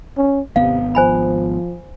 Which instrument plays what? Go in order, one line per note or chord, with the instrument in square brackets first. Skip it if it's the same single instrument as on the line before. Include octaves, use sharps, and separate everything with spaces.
[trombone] C#4
[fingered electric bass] G#1 B3 [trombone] C3 [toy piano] F5
[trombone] F3 [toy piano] C5 G#5 B5